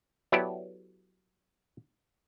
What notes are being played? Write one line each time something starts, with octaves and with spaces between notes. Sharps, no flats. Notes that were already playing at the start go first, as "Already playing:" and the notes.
F#3 B3 E4 G4 A4 D5